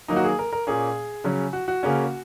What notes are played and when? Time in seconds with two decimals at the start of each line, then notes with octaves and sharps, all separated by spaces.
0.08 D#3 F#3 A#3 D#4
0.16 F#4
0.24 G#4
0.39 A#4
0.53 A#4
0.67 A#2 A#3 C#4 G#4
1.24 C#3 F#3 C#4
1.53 F#4
1.68 F#4
1.83 C#3 A#3 C#4